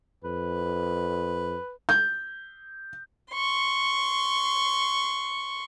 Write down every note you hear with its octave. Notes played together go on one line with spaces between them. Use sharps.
F2 B4
G6
C6 C#6